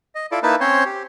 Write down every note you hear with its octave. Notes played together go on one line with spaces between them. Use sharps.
D#5
E4 F4 A4 D5
A#3 D#4 E4 B4 A5
C4 C#4 C5 C#5
G4